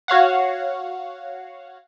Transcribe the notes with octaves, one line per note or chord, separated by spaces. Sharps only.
F#4 C#5 F5 F#5